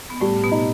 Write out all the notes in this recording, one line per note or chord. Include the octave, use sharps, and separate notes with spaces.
B3
A2 G3 A3
B2 B3
D#4